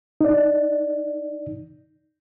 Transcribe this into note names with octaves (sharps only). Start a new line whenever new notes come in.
D#4 D5